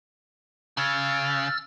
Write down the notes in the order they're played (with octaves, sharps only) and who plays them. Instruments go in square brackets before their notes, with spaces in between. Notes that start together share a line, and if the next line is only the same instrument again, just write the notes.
[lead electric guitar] C#3 [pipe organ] E6 F6 A6